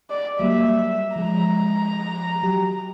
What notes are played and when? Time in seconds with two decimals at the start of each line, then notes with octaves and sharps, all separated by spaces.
0.10 D5
0.40 F#3 G3 A#3 E5
1.16 F3 G#3 A#5
2.43 F#3 G4